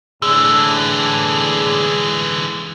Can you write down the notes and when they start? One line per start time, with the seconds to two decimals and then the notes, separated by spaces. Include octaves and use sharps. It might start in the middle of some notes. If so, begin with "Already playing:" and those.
0.22 A2 D3 E3 D4 G#4 E6